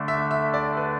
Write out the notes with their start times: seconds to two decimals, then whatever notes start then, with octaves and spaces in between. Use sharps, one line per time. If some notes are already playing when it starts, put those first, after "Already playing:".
Already playing: D3 A3 D4
0.08 E5
0.31 E5
0.54 D5
0.77 B4